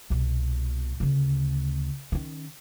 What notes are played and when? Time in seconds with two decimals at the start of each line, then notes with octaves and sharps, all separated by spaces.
0.10 C2 B2
1.00 D2 C#3
2.12 D#3 C#4